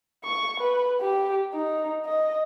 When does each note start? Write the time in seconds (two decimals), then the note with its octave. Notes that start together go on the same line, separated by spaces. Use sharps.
0.24 C#6
0.60 B4
1.01 G4
1.54 D#4
2.06 D#5